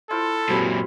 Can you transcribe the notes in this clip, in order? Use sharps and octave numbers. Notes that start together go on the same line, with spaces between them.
E4 F4 A4 C5
F#2 A#2 F#3 C4 G4 B5